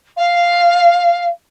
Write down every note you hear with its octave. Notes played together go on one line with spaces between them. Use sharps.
F5